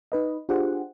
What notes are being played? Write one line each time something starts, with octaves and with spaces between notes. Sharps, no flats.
D#4 B4 D#5
D4 F4 G4 G#4 C5 F#5